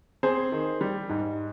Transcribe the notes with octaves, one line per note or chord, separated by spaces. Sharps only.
C4 G#4 C5
D#3
G3
G#2